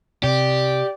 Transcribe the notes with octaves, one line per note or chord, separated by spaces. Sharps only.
C3 G4 D5